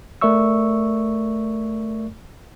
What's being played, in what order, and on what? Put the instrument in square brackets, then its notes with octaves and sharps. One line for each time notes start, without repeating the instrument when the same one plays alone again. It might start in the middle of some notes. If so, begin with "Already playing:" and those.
[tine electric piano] A3 A#4 D5 E5 C#6 E6